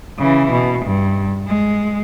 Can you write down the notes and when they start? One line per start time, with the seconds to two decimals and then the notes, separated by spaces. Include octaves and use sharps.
0.18 C#3 E3
0.52 B2
0.85 G2
1.48 G#3